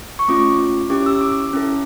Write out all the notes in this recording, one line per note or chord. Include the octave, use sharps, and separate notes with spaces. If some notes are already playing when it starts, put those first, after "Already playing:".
C#6
A3 C#4 F4 D6
C#4 E4 G4 D6
E6
D6
C#4 E4 A4